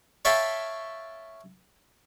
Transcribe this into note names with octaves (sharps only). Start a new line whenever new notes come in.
C#5 E5 F5 G5 A5 B5